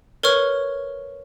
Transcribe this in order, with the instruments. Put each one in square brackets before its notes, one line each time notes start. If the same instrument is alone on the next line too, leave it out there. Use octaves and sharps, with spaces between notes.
[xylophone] A#4 B4 C#5 C#6 F6